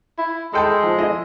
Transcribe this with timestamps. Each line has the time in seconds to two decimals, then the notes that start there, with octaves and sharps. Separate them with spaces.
0.18 E4
0.53 G#3 A4 G5 A5
0.83 F3
0.99 E4 D#5